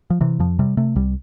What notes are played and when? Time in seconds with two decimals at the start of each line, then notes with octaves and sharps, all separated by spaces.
0.10 F3
0.21 C3 E3
0.39 F2 F3
0.59 C3 G3
0.77 C3 A3
0.96 C2 G3